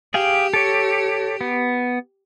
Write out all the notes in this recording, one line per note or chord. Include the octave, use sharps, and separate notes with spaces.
G4 G#4 F5 G5
A4 C#5
B3